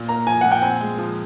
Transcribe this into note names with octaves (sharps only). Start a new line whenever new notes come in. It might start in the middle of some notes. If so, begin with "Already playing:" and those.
Already playing: A#2
A#3 A#5
F3 G#5
A#2 F#5
G5
C4 G#5
G#3
F3